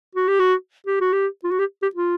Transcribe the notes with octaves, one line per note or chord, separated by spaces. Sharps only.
F#4
G4
F#4
G4
F#4
G4
F4
F#4
G4
G4
F4